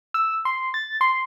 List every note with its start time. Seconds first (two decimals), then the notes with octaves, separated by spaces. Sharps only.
0.14 E6
0.45 C6
0.74 A6
1.01 C6